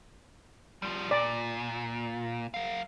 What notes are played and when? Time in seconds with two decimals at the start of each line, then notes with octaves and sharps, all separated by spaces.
0.82 F3 G3
1.11 A#2 D5
2.54 F#3 F5